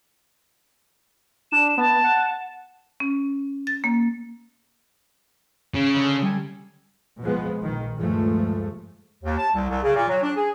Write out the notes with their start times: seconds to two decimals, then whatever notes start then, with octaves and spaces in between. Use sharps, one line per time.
1.52 D4 E7
1.77 B3 A5
2.04 F#5
3.00 C#4
3.67 A6
3.84 A#3
5.74 C#3
5.96 D3
6.22 G3 G#5
7.20 B2 F3 G#3 B3
7.61 A#1 A#2 D#3
7.96 D2 G2 F3 G#3 A3
9.24 D#2
9.38 A5
9.55 C2
9.68 C2
9.82 C#3
9.94 A#2
10.08 F#3
10.22 D4
10.35 G#4